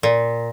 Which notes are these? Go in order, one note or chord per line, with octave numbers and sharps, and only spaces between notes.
A#2